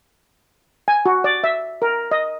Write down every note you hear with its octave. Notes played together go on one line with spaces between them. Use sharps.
G#5
F#4
D5
E5
A#4
D#5